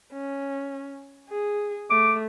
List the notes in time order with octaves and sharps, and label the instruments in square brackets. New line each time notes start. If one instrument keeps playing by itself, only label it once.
[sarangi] C#4
G#4
[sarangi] A3 [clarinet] D6